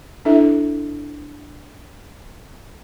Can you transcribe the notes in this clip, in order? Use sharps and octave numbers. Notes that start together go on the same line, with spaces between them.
D4 E4 A4 E5